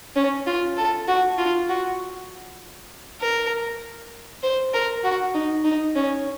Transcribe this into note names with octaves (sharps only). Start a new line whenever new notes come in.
C#4
F4
A4
F#4
F4
F#4
A#4
C5
A#4
F#4
D#4
D#4
C#4